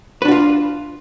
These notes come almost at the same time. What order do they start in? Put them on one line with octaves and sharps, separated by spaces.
B4 D4 F#4 F4